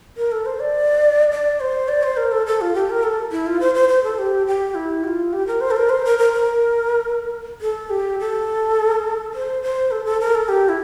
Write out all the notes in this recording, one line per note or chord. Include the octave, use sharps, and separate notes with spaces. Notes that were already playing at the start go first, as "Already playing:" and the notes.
A#4
A4
C5
D5
D5
C5
D5
C5
A#4
A4
A4
F4
G4
A#4
A4
E4
F4
C5
C5
C5
A4
G4
G4
E4
G4
F4
G4
A#4
C5
A4
A#4
C5
A#4
A#4
A#4
A4
G4
A4
C5
C5
A4
A4
A#4
A4
G4
E4